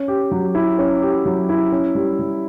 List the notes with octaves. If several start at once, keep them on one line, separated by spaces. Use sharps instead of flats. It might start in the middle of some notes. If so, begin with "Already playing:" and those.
Already playing: C#4
G4
F#3
E4
C#4
G4
F#3
E4
C#4
G3
G3